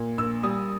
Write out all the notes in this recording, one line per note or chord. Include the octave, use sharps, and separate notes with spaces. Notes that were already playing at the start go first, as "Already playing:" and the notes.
Already playing: A#2
A#1 E6
G3 D#6